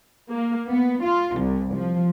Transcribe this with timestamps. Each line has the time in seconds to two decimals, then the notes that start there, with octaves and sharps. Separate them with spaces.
0.30 A#3
0.67 B3
1.02 F4
1.35 C2
1.72 F3